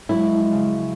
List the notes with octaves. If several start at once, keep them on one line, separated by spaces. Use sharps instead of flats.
F3 F#3 G#3 E4
C#3